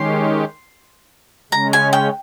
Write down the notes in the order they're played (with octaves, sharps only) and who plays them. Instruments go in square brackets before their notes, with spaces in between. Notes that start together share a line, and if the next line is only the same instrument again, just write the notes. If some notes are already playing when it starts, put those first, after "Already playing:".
Already playing: [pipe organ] D#3 G#3 C#4 G4 [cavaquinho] C6
[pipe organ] C#3 G#3 C#4 [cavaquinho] A#5
[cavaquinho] G#5
G5